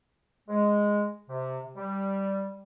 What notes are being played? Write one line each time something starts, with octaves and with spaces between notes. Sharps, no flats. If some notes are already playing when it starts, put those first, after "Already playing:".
G#3
C3
G3